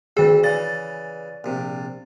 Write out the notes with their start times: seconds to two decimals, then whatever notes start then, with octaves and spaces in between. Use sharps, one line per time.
0.17 D2 D#3 C4 G#4
0.43 C#3 E3 D5 A6
1.44 A#1 C3